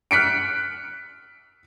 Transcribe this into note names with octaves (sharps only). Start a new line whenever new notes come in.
F6 F#6 B6 C#7 D7